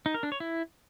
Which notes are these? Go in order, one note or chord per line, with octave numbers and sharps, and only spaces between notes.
D#4
A#4
D4
C#5
E4